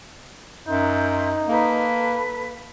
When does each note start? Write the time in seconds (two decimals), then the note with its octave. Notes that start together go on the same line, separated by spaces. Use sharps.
0.67 F#2 D#4 E5 C6 G6
1.48 A#3 A4 B4